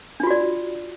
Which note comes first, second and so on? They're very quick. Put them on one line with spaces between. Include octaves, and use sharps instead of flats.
D4 F4 F#4 D5